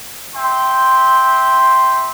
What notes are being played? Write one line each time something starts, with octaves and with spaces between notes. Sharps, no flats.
E5 G5 C6